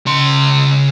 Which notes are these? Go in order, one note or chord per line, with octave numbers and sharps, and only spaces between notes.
C#3 C6